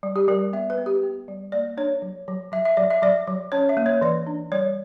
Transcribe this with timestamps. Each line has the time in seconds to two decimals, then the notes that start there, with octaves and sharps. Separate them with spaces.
0.03 G3
0.16 G4
0.28 G3 A#4
0.53 B3 E5
0.70 B4
0.78 B3
0.86 G4
1.03 B3
1.28 G3
1.52 A#3 D5
1.77 D4 C#5
2.02 F#3
2.28 F#3
2.52 F#3 E5
2.65 E5
2.77 F#3 D5
2.90 E5
3.02 F#3 D5
3.27 F#3
3.52 C#4 C#5
3.69 E5
3.77 A#3
3.86 C#5
4.01 E3 D5
4.27 D4
4.52 G3 C#5